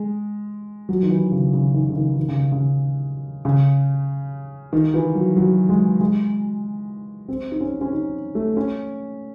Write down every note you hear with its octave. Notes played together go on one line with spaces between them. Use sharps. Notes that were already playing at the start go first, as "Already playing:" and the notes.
Already playing: G#3
F#3
D#3
E3
C#3
C#3
D#3
C#3
D#3
D#3
C#3
C#3
C#3
D#3
E3
F#3
F#3
G#3
G#3
C4
D#4
C#4
C#4
D#4
A3
C#4